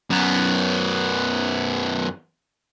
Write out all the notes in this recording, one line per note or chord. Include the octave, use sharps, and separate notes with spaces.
F#2 B3